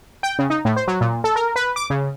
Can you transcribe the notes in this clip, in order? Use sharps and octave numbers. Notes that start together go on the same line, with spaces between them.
G5
C#3
D#4
A2
C5
F#3
A#2
A4
A#4
B4
D6
C#3